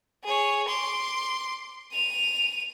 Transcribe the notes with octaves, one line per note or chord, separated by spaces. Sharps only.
G#4 C#5
C6 D6
D#7 F7